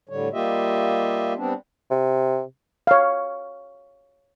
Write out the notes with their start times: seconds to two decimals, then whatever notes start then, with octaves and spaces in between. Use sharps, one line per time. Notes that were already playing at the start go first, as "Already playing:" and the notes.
0.09 A2 D3 G3 C#5
0.33 G3 A#3 F4 G4 D#5 E5
1.37 G3 B3 C4 D4
1.90 C3
2.87 C#5 F5